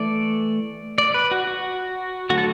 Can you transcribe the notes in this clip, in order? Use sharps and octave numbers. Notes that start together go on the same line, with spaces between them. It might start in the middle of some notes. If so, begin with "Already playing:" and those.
Already playing: E3 A3 D5
D5
B4
F#4
F#4
D3 F#3 A3 F#4
A4